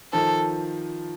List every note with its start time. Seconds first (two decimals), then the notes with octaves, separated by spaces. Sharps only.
0.13 D#3 F3 A4